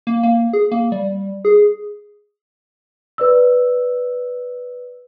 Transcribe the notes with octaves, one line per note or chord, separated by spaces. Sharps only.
A#3
A#3
G#4
A#3
G3
G#4
B4 D5 E6